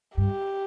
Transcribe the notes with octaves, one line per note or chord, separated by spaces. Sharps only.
G2 G4